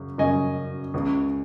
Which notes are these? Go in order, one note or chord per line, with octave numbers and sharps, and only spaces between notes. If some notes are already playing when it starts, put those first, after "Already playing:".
Already playing: F#2 C#3
F#2 C#3 D#5 G#5
C#2 C#3